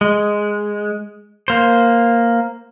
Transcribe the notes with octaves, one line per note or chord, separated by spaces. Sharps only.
G#3
A#3 C5